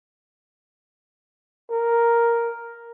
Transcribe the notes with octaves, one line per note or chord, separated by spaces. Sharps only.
A#4